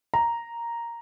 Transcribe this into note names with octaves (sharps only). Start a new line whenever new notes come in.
A#5